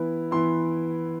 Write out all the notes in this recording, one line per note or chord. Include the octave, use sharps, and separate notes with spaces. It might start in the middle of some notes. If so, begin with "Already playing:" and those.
Already playing: E3 B3 E4
E3 B3 E4 C6